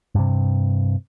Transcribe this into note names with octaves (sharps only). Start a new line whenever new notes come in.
G2 C3